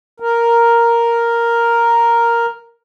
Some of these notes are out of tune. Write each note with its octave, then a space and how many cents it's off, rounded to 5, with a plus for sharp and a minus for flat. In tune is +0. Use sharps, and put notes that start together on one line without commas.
A#4 +0